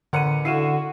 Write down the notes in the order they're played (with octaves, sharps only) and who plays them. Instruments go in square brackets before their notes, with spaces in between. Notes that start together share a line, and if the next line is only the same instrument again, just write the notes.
[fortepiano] A1 A#4 F#5 [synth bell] D3 C#7 D#7
[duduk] D3 [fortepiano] E4 F5 [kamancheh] F#4 [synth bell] C7 D#7 E7